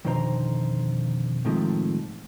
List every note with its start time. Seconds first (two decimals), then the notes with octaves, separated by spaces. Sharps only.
0.05 F2 B2 D3 D#3 C5 A#5
1.45 A2 C3 D#3 F3 G#3 A3